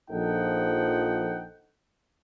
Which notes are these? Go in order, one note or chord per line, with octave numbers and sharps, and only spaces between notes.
A#1 F3 D#4 A4 F#5 G5